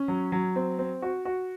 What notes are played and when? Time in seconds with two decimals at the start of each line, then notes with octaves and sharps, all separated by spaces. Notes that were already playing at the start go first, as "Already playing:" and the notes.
Already playing: C#4
0.08 F#3
0.32 F#3
0.56 C4
0.79 C4
1.02 F#4
1.25 F#4